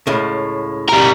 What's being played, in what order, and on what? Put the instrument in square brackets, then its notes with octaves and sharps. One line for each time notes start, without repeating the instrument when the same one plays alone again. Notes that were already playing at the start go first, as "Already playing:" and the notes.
[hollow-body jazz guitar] C#2 A2 C#3
[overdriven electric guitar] G3 A#4